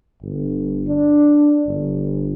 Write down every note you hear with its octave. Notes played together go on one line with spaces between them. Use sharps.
G1
D4
G1